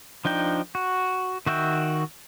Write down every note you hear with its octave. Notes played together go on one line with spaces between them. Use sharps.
F3 D4 D#4 G5
F#4
D#3 F#4 E5 G5